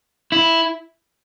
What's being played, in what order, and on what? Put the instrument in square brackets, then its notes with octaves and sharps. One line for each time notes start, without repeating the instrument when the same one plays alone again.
[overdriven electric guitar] E4